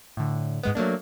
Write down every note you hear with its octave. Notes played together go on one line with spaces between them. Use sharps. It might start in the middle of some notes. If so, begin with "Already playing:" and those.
A2 D3
G#2 G#3 B3
F#3 A3 A#3 D4